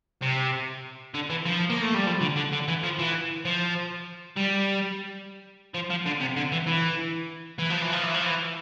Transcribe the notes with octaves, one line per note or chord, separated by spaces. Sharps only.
C3
D3
E3
F3
A#3
A3
G3
F3
D3
D3
D3
E3
F3
E3
F3
G3
F3
F3
D3
C3
D3
E3
E3
E3
F3
E3
F3
E3
F3
E3